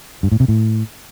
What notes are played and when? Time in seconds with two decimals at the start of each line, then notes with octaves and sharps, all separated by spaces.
0.23 G2
0.32 A2
0.40 C3
0.48 A2